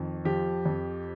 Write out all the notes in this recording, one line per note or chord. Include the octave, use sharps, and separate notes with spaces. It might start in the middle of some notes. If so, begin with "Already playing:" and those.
Already playing: F2 D#3
F3 G4
F2